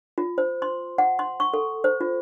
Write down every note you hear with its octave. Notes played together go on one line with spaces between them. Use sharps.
F4
C5
C6
F#5
C6
C#6
A4
C5
F4